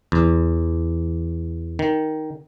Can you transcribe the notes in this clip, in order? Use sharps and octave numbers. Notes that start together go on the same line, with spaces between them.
E2
D#3